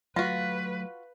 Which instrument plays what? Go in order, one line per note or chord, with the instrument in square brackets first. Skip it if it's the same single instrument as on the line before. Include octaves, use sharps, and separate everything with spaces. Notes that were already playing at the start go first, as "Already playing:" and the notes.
[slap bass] F#3 A3 [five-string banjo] F4 F#4 [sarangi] B4 [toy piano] F5